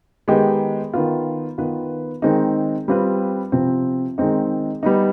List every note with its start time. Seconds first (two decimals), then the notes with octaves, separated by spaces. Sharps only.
0.28 D#3 G#3 B3 D#4 G4
0.94 D#3 B3 F4
1.58 D#3 B3 F4 B4
2.22 D#3 G#3 C4 D#4
2.88 G3 C4 F4 B4
3.52 C3 F3 C4
4.18 D#3 G#3 C4 D#4
4.83 G3 B3 D#4